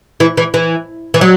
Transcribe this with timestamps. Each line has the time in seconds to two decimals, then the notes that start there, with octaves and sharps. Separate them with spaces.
0.20 E3
0.37 E3
0.54 E3
1.14 E3
1.21 F#3